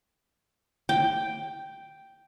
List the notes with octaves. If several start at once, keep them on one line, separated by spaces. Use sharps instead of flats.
G5